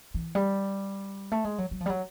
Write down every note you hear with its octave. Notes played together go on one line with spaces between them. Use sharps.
E3
G3
A3
G#3
F#3
F#3
F3
G3
F#3